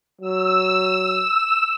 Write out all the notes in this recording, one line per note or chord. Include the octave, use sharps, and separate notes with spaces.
F#3 E6